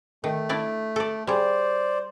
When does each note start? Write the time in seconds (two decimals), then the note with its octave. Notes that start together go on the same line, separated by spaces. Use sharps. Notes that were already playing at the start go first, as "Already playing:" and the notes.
0.24 D#3 A3
0.49 D4 E4 D5
0.96 A4 D5
1.27 G3 G#4 C5 D5